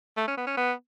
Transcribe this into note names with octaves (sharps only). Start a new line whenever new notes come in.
A3
C#4
B3
C#4
B3